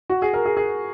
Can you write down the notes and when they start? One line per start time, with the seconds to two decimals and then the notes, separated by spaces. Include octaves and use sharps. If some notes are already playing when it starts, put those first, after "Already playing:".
0.10 F#4
0.22 G#4
0.34 A#4
0.45 G#4
0.57 G#4